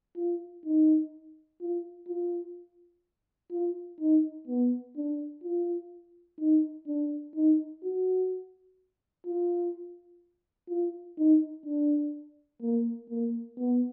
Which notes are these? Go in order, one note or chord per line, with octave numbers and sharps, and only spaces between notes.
F4
D#4
F4
F4
F4
D#4
B3
D4
F4
D#4
D4
D#4
F#4
F4
F4
D#4
D4
A#3
A#3
B3